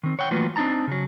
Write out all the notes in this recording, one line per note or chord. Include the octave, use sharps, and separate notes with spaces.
D#3 C4
C#5 F#5 G5
E3 F#3 A3 A#3 F4 B4
C4 D4 D#4 A5 A#5
C#3 F#3